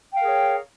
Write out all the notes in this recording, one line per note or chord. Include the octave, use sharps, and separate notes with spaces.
G#4 A#4 C#5 F5 G5